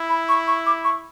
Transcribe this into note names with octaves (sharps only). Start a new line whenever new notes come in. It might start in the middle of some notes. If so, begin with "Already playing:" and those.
Already playing: E4
B5
C#6
C#6
D6
C#6